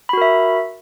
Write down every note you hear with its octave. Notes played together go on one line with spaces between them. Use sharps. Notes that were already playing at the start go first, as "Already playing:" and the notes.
F#4 A#4 E5 B5